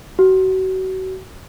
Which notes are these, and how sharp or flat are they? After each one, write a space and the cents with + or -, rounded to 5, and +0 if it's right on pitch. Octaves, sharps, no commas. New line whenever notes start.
F#4 +30